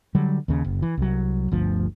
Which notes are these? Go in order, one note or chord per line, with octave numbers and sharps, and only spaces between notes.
D3 F#3 G3
D#2 C#3
F#1
E3
C2 F#3
G1 D2 F3